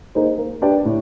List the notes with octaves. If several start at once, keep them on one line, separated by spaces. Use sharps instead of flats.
A#3 D#4 G#4 C5
A#3
D4 G4 B4 D5
A2